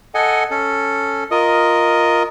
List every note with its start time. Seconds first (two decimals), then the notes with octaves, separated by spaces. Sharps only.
0.15 A4 D#5 F#5 G#5
0.50 C#4 A4
1.31 F4 A#4 D#5 D#6